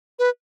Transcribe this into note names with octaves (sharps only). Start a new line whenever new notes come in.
B4